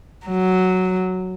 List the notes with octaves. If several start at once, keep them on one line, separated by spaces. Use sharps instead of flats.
F#3